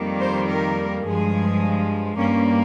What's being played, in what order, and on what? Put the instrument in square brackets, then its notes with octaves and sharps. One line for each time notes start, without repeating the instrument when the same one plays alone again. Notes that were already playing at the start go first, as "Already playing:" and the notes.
Already playing: [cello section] F2 D#3 G3 A#3
C5
A#4
G2 F3 G#3 G#4
G2 G3 A#3 C#4